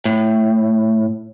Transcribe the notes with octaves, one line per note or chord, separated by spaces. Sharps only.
A2